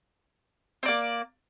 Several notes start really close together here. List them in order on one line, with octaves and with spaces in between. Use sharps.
C4 D5 A#3